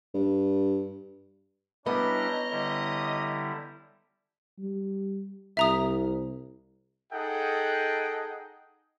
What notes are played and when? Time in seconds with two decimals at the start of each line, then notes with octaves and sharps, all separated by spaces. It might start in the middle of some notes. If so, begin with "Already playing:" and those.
0.14 G2
1.86 G3 B3 C#4 D4 E4 D#5 A#5
2.51 D3 G3 E4
4.58 G3
5.57 C2 E5 A#5 D#6
7.13 D#4 G#4 A4 D#5 F#5 G5